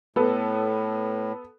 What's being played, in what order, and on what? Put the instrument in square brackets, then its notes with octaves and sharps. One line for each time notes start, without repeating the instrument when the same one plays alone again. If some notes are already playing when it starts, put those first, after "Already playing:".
[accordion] A2 [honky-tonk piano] B3 A4